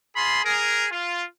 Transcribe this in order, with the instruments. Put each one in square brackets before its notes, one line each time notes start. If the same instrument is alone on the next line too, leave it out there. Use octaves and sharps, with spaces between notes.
[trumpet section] F4 G#4 B5 C6
G#4 A#4
F4